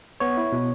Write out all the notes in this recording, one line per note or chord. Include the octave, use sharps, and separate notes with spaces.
B3 C#5
E4
B2